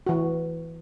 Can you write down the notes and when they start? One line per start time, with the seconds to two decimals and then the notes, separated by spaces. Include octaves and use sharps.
0.07 E3 F#4